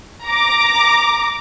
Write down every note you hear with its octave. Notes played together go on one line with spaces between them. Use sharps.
A#5 D6